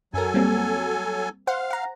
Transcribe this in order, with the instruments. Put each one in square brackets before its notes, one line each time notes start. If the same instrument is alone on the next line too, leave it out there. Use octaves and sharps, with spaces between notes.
[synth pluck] F#2 A#4 [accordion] F#3 A4 G#5
[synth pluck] G3 A#3 C4
[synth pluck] C5 F#5 [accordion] F5
[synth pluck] F#5 A#5